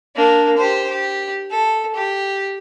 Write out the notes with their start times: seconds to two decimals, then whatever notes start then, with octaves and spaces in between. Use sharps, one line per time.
0.16 A#3 D4
0.57 G4 C5
0.90 G4
1.51 A4
1.95 G4